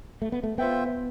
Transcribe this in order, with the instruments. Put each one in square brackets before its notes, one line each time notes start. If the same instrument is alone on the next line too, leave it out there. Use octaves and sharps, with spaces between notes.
[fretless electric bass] A3
B3
A3
[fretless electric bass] B3 [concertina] F4 C5 E5 G5